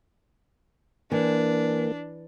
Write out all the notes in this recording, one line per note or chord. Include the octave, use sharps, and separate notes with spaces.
E3 A#3 D4